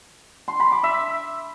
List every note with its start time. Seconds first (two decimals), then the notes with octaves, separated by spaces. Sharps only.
0.48 C6
0.60 B5
0.72 D6
0.84 E5